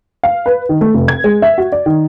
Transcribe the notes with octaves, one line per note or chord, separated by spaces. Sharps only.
F5
B4
D#3
A3
F1
G#6
G#3
E5
F#4
D5
D#3